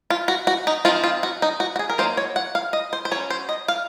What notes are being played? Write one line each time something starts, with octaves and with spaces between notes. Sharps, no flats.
F4
F#4
F#4
D#4
F3 C4 D#4 F4
F4
F#4
D#4
F#4
F#4
G#4
A#4
F#3 A#3 D#4 C5
C#5
F#5
F5
D#5
C5
C5
F#3 C#4 C#5
C5
D#5
F5